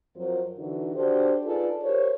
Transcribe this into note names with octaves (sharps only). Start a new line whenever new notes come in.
F2 F3 F#3 A#4 C5
D3 E3 D#4 F#4
D4 F#4 G4 A4 C5 D5
D#4 F4 G#4 A4 B4 D5
G4 A#4 C5 C#5